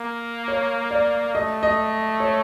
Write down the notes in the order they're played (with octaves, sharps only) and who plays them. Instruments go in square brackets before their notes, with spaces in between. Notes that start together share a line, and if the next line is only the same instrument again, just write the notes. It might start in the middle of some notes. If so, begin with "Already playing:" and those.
Already playing: [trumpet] A#3
[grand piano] C#5
D5
[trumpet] A3 [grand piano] D#5
[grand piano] D#5
C#5